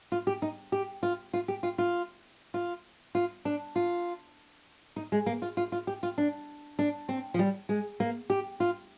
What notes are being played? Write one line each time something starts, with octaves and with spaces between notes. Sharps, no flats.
F4
G4
D#4
G4
F4
F4
G4
F4
F4
F4
F4
D4
F4
D#4
G#3
A#3
F4
F4
F4
G4
F4
D4
D4
C4
F3
G3
G#3
A#3
G4
F4